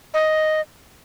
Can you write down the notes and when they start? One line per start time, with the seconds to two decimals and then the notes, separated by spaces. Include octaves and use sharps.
0.14 D#5